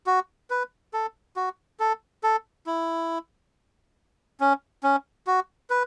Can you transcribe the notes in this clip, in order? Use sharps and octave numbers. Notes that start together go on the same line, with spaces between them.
F#4
B4
A4
F#4
A4
A4
E4
C#4
C#4
F#4
B4